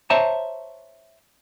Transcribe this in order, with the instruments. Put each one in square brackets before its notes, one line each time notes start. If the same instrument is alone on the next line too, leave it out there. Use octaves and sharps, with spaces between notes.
[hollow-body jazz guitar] C5 C#5 E5 A5 A#5